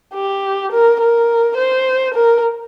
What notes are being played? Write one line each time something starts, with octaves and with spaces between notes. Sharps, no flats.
G4
A#4
A#4
C5
A#4